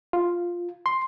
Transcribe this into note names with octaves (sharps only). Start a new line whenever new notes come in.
F4
C6